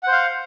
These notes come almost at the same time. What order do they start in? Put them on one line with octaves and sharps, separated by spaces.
F#5 C5 F5